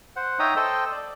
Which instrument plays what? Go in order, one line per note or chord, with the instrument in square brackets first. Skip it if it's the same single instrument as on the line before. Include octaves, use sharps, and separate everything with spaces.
[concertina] C5 F#5
D#4 C#5 E5 G5 A#5 D#6
A4 C5 D#5 G5 E6
D5